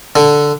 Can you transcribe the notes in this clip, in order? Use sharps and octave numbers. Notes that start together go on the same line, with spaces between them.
D3